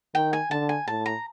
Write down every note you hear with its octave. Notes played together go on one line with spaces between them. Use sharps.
D#3 G5
G#5
D3 A5
G#5
A2 A5
A#5